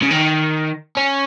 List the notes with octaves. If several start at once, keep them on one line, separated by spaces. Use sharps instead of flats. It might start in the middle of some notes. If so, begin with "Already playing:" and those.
C#3
D#3
C#4